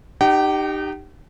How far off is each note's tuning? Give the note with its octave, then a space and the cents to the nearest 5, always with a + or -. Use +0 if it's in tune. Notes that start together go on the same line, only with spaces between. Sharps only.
D#4 -25 G4 +0 G5 -45